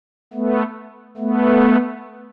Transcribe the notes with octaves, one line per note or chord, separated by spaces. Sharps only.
A3 B3
A3 B3